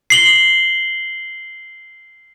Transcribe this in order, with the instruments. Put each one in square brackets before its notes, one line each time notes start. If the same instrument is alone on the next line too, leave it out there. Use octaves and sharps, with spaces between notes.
[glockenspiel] C7 F#7 G7